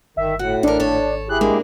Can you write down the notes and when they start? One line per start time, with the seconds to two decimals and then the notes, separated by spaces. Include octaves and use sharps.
0.17 G1 D#3 E5
0.39 A2 F#4 F#5
0.63 A1 D4 A4 A#4
0.80 G#1 A4 C#5
1.29 E4 G4 G#4 F#6
1.41 G#2 G#3 A#3 D4